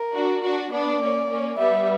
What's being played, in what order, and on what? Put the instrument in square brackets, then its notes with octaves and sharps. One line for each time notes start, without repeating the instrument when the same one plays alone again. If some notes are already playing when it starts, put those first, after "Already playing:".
Already playing: [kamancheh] A#4
[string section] D4 F#4
D4 F#4
[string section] B3 D4 [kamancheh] D5
[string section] A#3 C#4
A#3 C#4
[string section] G3 B3 [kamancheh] E5